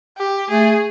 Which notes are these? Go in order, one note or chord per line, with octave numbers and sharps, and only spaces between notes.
G4
A3 G#4